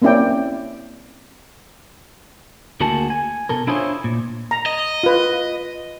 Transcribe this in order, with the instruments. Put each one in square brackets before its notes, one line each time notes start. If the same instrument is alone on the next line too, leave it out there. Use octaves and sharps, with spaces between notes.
[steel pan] A#3 C4 C#4 E4 D5 G5
[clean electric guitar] D2 A#3 F#4 G#4 A5
G#5
B2 A4 A#4
D4 E4 F4 G#4 C5 C#5
A#2
[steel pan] A#5
[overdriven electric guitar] D#5
[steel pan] F4 B4